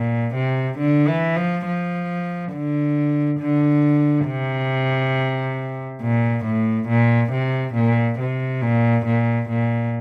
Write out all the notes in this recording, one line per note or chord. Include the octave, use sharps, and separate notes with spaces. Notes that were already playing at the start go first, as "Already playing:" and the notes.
Already playing: A#2
C3
D3
E3
F3
F3
D3
D3
C3
A#2
A2
A#2
C3
A#2
C3
A#2
A#2
A#2